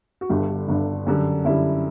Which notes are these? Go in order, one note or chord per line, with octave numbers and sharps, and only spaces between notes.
F#4
G1 G2 D3 G4
G4
G1 G2 D3
F#2 D3 G3
F#2 D3 G3 E4